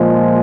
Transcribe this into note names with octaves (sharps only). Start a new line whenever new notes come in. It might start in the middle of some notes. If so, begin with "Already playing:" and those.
Already playing: A#2 F3 G#3